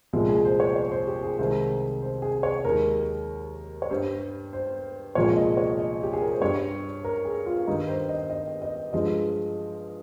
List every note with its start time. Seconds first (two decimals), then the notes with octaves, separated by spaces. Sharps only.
0.13 C2 A#2 F3 G#3
0.29 G#4
0.45 C5
0.60 C#5
0.76 C#5
0.92 C5
1.07 G4
1.23 G#4
1.39 C2 C3 D#3 G#3 C5
2.02 C5
2.22 G#4
2.43 C#5
2.65 D#2 D#3 G#3 A#4
3.82 C#5
3.90 G2 G3 C5
4.53 C5
5.15 C2 A#2 F3 G#3 C#5
5.36 D#5
5.57 C#5
5.79 D#5
6.03 G4
6.13 G#4
6.22 A#4
6.32 C5
6.42 G2 G3 C#5
7.05 A#4
7.25 G#4
7.46 F4
7.67 G2 D#3 G3 D#4
7.88 C5
8.09 D#5
8.30 D#5
8.62 D#5
8.93 G2 F3 G#3 D#5